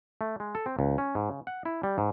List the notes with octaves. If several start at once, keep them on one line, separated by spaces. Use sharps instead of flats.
A3
G#3
A4
C4
C#2
C#4
G#2
C#3
F#5
E4
G3
G#2